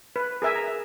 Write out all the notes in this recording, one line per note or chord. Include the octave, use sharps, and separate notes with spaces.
B4
G#4 A#4 E5 G#5
A#5
E5